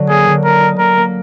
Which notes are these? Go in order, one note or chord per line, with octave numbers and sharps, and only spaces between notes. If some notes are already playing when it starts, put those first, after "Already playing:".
Already playing: D3 F#3
A#3 G#4
D3
A#3 A#4
D#4
A#3 A#4
A#3